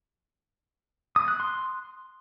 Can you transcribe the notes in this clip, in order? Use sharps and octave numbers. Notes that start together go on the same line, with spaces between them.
D#6
F#6
C6